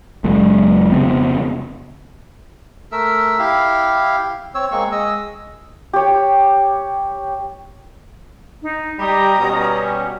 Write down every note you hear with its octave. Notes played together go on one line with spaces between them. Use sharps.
F#1 F#2 G#3
F1 C#3 B3 C4
A3 A#4 E5 E6
E4 G4 F5
C4 C#5 E6
G#3 A#3 C4 C#6
G#3 D#5 E6
G4 C#5
D#4
G3 G4 D#5 A#5 D#6
B2 G3 C#4